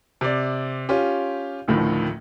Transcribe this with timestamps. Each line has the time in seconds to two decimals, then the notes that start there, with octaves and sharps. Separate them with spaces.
0.21 C3 D5
0.89 C#4 F4 G4
1.68 A1 D2 A2 D#3 F3